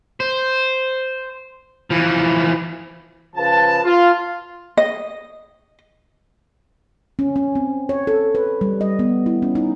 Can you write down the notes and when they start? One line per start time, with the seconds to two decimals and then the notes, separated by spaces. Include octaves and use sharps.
0.20 C5
1.90 E3 F3
3.36 C#3 F3 B4 A5
3.84 F4
4.77 D#5
7.19 C#4
7.36 C#4
7.55 C4
7.89 C#5
8.07 A4
8.35 B4
8.61 G3
8.81 D#5
8.99 B3
9.26 E4
9.42 C#4
9.55 D#4